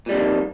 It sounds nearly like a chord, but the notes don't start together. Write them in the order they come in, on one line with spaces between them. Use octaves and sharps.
A#2 G3 D3 F2 D#3